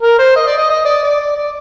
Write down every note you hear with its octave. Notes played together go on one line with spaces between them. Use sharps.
A#4
C5
D#5
D5
D#5
D#5
D5
D5
D5